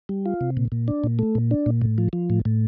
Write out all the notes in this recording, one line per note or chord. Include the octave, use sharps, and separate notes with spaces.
G3
F4
C3
A#2
A#2
D4
A#2
A3
A#2
D4
A#2
A2
F3
F3
A2
A2